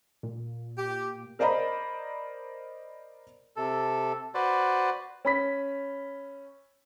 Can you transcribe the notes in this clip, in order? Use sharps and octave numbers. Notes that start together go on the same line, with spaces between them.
A#2
G4
A#4 C5 D5 D#5 A#5 B5
C3 A4
F#4 B4 C5 D5
C#4 B5 B6